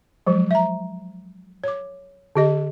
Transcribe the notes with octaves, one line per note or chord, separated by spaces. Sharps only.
F3 F#3 G#3
E5 A#5
C#5 D6
D3 G4 D#5